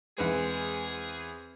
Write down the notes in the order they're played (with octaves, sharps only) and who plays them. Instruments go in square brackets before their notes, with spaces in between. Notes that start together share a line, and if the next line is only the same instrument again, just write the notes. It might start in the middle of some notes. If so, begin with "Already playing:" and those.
[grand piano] E2 E3 C5 [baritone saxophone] G#3 [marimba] C4 B4 [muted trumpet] G#4